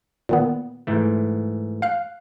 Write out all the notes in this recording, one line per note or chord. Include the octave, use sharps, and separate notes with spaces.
A#2 D#3 B3
G#2 E3 A3
F5 F6 F#6